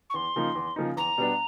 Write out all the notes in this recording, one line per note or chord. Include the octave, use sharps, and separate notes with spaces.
C#6
E2 C6
C#3 F3 A#3 D#4
E2
C#3 F3 A#3 D#4
E2 A#5
B2 G3 B3 D4